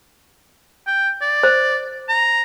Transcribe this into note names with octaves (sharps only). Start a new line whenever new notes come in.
G5
D5
C5
A#5